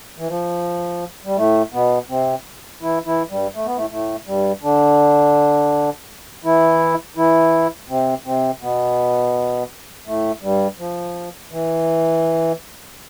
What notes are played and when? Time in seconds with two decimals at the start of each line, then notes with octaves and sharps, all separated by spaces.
0.18 E3
0.28 F3
1.25 G3
1.37 A2 A3
1.73 B2 B3
2.09 C3 C4
2.82 E3 E4
3.06 E3 E4
3.30 G2 G3
3.55 A3
3.66 B3
3.77 A2 A3
3.90 A2 A3
4.27 G2 G3
4.63 D3 D4
6.43 E3 E4
7.16 E3 E4
7.89 C3 C4
8.26 C3 C4
8.62 B2 B3
10.06 A2 A3
10.42 G2 G3
10.78 F3
11.51 E3